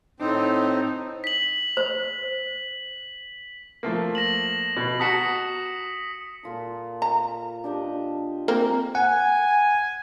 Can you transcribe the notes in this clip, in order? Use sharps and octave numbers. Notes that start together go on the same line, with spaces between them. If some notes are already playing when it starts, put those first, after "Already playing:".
A2 C4 D#4
B6 F#7
C5
F3 A3 A#3
A#6 E7 F#7
B2
F#4 A5 A#5 D#6 B6 C#7
A#2 F4 A4
A#5
D4 G4 D#5
G#3 A#3 C4 A#4
F#5 G#5